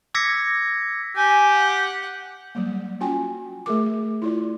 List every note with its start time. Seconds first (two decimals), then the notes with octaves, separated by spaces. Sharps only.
0.14 D6 E6 G#6 A#6 B6 C#7
1.16 G4 G#5
1.51 F#5
2.55 F#3 G3 A#3
3.00 C#4 F4 F#4 G5 G#5
3.66 A3 G#4 A#4 D6
4.22 E4 F4 D5